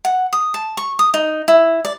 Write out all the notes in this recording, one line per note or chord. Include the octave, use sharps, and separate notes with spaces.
F#5
D#6
A5
C#6
D#6
D#4
E4
D5